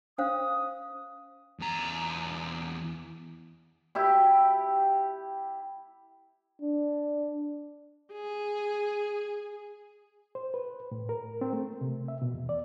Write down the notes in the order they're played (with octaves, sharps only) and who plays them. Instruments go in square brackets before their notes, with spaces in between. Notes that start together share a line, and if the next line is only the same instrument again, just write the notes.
[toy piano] C#4 C5 F5 [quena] D#6
[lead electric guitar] E2 A#5
[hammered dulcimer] E4 G4
[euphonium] D4
[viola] G#4
[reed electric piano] C5
B4
A2
A#4
C4
A3
C3
E5
B2
E2
D5